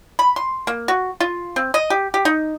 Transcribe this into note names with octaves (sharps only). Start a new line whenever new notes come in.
B5
C6
A#3
F#4
F4
C4
D#5
G4
G4
D#4